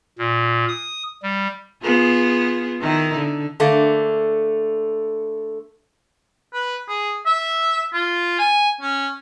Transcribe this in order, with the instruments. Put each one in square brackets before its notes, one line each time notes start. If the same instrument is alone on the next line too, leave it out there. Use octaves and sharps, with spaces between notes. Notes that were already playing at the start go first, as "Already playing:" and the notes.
[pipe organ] A#2
D#6
G3
[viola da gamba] B3 F4 G#4
D#3 D#4 E4
D3
[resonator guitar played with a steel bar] D3 A3 A#3
[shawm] B4
G#4
E5
F4
G#5
C#4